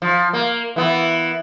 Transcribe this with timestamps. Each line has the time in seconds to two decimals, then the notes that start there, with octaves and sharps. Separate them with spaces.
0.02 F3
0.33 A#3
0.76 E3 B3